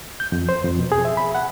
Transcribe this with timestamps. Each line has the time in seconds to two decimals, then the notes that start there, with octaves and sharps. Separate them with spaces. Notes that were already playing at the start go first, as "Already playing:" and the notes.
0.20 G6
0.32 F2
0.49 C5
0.64 F2
0.79 B2
0.92 G#4
1.05 E5
1.17 B5
1.35 F#5